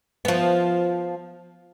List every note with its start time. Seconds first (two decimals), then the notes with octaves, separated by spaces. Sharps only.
0.25 F3 B3